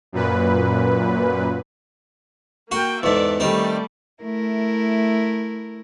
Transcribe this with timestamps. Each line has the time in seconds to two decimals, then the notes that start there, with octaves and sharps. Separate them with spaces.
0.12 F#2 A#2 B4
2.71 A#3 F#4 G5
3.03 E2 G#2 A4 D5 E5
3.40 D#3 G3 A3 C4 D5
4.23 A3 E4 A#4